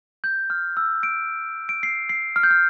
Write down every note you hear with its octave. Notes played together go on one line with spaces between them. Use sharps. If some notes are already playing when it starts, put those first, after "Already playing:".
G6
F6
E6
D7
D7
C7
C7
F6
G6
F6